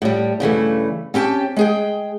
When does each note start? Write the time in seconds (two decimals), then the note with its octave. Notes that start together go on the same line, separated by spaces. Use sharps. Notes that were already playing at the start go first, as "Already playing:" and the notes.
0.02 A2 G3
0.40 G2 C#3 E3 A3
1.14 C4 C#4 G4 G5 A5
1.56 G#3 G#4 G5